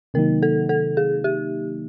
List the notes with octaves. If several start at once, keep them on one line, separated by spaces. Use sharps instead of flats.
C3 D#3 F#3 A#3 D#4 A#4
A4
A4
G#4
G4